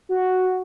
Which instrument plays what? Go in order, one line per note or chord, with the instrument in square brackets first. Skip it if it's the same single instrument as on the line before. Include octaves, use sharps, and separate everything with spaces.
[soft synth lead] F#4